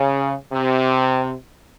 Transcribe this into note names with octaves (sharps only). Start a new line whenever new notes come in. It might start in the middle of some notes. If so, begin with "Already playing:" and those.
Already playing: C#3
C3